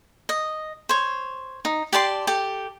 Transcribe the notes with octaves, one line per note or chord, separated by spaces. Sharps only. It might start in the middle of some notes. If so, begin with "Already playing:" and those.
D#5
C5 C#5
D#4
G4 D5 A5 C6
G4 A4